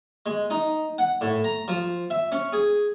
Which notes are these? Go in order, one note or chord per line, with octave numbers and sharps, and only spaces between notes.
G#3
D#4
F#5
A2
A#5
F3
E5
C#4
G#4